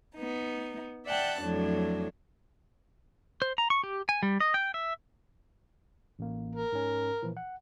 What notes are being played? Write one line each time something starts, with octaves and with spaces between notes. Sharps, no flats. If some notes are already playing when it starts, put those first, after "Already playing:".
B3 D#4
D5 E5 F#5 G5 A5 F#6
F2 A2 F#3 D4
C5
A#5
C#6
G4
G#5
G3
D#5
G5
E5
A1 A#3
A#4
G#2 C#4
A#2 E3 F3
F#5